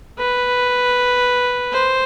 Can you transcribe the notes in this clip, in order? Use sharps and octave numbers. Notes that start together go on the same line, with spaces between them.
B4
C5